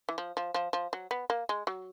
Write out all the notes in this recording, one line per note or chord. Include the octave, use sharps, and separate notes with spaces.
E3
F3
F3
F3
F3
F#3
B3
A#3
G#3
F#3